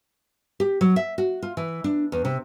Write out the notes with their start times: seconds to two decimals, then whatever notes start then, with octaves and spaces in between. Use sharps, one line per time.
0.60 G4
0.81 F#3
0.96 E5
1.18 F#4
1.42 F4
1.57 E3
1.84 D4
2.12 E2
2.25 C3